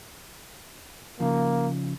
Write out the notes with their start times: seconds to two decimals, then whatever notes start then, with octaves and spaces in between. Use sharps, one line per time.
1.20 C#3 F3 A#3